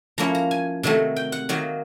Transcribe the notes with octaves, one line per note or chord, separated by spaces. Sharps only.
F3 A#3 C#4 E4 A#5
A#5
G#5
C3 D#3 F#3 A3
G5
F#5
D#3 F#3 A#3